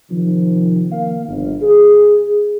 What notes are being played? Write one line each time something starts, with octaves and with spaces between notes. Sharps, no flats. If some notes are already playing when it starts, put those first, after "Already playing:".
C3 D#3 F3
A#3 F5
G1
G#4